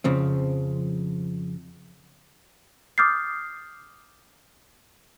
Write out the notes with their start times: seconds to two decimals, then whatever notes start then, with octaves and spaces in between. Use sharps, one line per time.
0.04 F2 C#3 F3 C4
2.98 D6 D#6 F6 G6 A6 C7